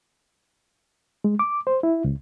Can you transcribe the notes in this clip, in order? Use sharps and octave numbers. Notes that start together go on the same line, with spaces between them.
G#3
D6
C5
E4
C#2